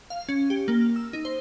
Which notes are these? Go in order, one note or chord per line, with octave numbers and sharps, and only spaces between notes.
F5
C#4
G4
A#3
F6
E6
D#4
C5